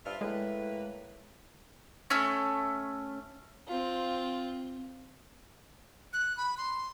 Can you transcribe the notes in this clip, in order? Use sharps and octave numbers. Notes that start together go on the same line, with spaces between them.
G2 F4 E5
A2 G#3 A#3 B4
A3 C#4
C4 F4
F#6
B5
C6